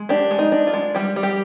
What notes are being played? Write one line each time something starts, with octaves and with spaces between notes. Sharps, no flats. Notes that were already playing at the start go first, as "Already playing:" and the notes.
Already playing: G#3
D4 G4
G#3
D#4
D4
F4
G#3
G3 G4
G3
G4